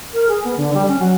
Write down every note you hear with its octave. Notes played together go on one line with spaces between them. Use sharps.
A#4
G#4
B3
D3
G3
C#4
F#3